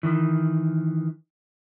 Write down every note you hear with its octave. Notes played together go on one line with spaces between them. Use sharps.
D#3 E3